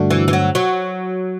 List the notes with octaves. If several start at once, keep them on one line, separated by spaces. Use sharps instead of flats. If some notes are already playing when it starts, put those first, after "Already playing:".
Already playing: G2 D3 A3 D4 F#4
E3
E3
F#3
F#3